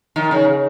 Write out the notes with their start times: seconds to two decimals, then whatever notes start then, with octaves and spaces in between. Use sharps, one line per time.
0.16 D#3
0.31 C#3